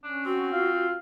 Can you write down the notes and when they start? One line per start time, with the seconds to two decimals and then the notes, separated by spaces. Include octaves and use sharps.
0.04 C#4 D4
0.26 C4 F#4
0.53 F4 F5